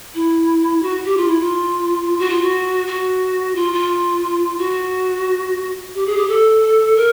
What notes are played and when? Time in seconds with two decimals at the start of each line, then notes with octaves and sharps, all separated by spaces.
0.14 E4
0.82 F#4
1.05 G4
1.16 F4
1.27 E4
1.39 F4
2.19 F#4
2.29 F4
2.40 F#4
2.87 F#4
3.55 F4
3.73 F4
4.57 F#4
5.94 G4
6.06 G#4
6.16 G4
6.28 A4
6.96 A#4